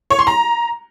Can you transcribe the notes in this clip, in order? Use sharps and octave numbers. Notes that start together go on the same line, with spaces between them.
C#5
C6
A#5